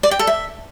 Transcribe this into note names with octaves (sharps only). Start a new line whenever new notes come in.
D5
G5
A4
E5